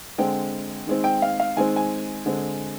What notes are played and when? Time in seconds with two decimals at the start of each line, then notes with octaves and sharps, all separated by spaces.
0.18 D3 G#3 C4 G5
0.87 D#3 G#3 C4
1.04 G5
1.22 F5
1.40 F5
1.57 D#3 G#3 C4 G#5
1.76 G#5
2.25 D3 G#3 C4